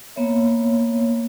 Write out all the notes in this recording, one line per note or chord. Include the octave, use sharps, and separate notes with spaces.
A#3 B3 C#5 E5